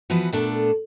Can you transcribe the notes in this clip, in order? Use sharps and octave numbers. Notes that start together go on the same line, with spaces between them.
E3 F3 B3 F#4 B4
A#2 A3 B3 D4 A4